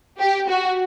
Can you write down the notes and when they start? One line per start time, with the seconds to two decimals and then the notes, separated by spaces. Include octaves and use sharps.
0.19 G4
0.48 F#4